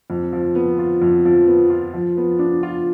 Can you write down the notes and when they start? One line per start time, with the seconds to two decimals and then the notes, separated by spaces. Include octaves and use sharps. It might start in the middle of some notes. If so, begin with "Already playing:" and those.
0.10 F2
0.33 F3
0.55 B3
0.79 F4
1.02 F2
1.25 F3
1.47 B3
1.70 F4
1.94 F3
2.17 B3
2.39 D4
2.63 F4